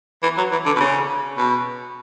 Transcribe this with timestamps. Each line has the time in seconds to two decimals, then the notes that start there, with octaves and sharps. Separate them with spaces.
0.23 E3
0.38 F#3
0.52 E3
0.66 D3
0.76 B2
0.80 C#3
1.38 B2